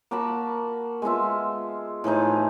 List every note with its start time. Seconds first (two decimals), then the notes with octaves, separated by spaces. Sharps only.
0.11 A#3 F#4 A5 B5
1.02 G#3 B3 F4 E5
2.04 A2 E3 F3 D#4